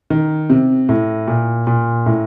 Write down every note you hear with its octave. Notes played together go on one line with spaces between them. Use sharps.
D#3
C3
A2
A#2
A#2
A2